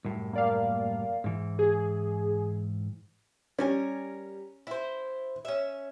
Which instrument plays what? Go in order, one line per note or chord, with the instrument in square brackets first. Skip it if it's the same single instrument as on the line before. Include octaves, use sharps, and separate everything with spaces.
[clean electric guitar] C2 F#2 A2
[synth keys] A#3 D5 F5
[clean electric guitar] G#2 E3
[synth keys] G#4
[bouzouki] G3 A#4 G#5 [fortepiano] C#4
[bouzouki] E4 C5
C#4 E5